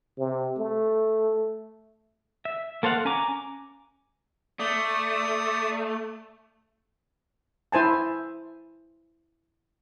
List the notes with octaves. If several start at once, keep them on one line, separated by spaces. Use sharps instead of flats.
C3
A3
E5
A#3 A4 C5 F5 F#5
C#4 G#5 A#5 D6
A3 D5 D#6
E4 C5 G#5 A5